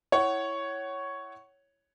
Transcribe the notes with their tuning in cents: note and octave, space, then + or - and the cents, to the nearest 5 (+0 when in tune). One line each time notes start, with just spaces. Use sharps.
E4 +0 C#5 +0 F#5 +25